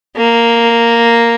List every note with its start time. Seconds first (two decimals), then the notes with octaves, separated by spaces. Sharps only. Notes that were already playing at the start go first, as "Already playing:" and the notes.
0.16 A#3